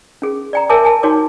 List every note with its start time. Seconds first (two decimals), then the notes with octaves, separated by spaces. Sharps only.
0.22 C#4 G#4
0.53 D5 G5 A#5
0.70 A#4 C#5 E5 G#5 A5 D6
0.84 G#5 A5
1.03 D#4 F#4 C#5 G5 D6